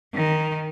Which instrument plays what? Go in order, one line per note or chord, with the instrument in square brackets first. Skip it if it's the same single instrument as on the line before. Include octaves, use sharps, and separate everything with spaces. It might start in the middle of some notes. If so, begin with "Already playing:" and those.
[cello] D#3